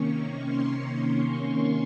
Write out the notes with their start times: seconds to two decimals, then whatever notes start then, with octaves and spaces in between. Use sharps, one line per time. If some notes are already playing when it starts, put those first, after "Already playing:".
Already playing: C3 D#3 A#3 C#4 C#6
0.47 C6